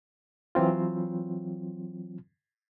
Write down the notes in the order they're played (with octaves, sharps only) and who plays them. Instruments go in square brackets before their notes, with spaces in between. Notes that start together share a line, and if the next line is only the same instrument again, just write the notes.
[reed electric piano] E3 F#3 C4 F4